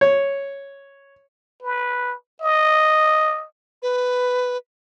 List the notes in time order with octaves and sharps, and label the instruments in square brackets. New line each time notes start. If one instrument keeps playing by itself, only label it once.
[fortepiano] C#5
[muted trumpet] B4
D#5
[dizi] B4